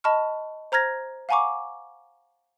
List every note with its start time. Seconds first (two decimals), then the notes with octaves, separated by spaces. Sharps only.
0.04 D#5 A5 B5 C#6 F6
0.72 C5 A#5 F6 G#6 A#6
1.29 F5 F#5 G#5 A#5 C#6 D6